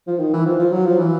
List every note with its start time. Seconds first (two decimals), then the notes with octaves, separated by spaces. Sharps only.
0.07 F3
0.19 D#3
0.33 E3
0.45 F3
0.59 F3
0.72 F#3
0.85 F3
0.99 E3